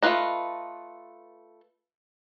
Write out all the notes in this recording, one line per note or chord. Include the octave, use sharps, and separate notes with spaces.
A3 C#4 F4 B4 D#5